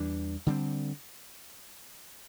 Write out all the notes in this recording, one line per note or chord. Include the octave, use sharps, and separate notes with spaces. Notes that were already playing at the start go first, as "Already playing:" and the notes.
Already playing: E2 E3 G3 D4
D3 G3 C4